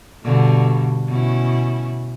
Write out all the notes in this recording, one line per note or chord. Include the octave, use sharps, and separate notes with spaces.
G2 B2 D3
B2 C#4 E4